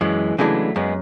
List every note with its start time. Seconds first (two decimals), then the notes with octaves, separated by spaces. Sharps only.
0.01 F#2 E3 G#3
0.38 C#3 E3 F#3 G#3 A3 D4
0.76 F#2 G#3 B3